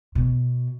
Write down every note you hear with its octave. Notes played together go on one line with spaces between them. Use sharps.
B2